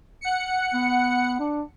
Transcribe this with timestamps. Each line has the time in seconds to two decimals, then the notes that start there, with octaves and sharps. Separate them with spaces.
0.21 F#5 C#7
0.74 B3
1.40 D4